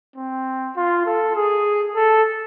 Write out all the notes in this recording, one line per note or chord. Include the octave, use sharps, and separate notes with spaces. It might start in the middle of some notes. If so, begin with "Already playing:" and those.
C4
F4
A4
G#4
A4